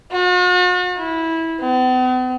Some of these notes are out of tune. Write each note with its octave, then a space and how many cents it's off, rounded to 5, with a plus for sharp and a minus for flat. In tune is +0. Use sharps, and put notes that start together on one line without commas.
F#4 -45
E4 -15
B3 +45